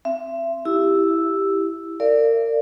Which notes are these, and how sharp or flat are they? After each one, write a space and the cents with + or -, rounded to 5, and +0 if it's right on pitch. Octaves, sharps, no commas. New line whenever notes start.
C4 +0 E5 +30
E4 +0 G4 +0 E6 +0
A#4 -30 D5 +0 F5 -45